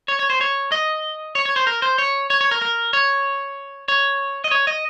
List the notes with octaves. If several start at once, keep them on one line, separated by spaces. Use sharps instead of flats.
C#5
C#5
C5
C#5
D#5
C#5
C#5
C5
A#4
C5
C#5
C#5
C#5
A#4
A#4
C#5
C#5
D#5
C#5
D#5